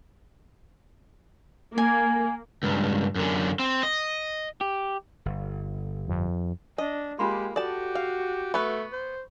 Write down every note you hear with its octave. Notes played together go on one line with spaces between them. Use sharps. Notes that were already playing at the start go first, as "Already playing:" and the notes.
A#3 G#5
C#2 G2
F#2 D3
C4
D#5
G4
G1
F2
D4 D#5
G#3 A#3 F4 G4 B5 C6
F#4 G4 A4 D5 A5
F5
A3 B3 B4 B5 C#6
C5